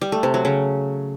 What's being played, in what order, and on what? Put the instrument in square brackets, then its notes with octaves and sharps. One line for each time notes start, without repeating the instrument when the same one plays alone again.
[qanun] G3
A3
C3
F#3
C#3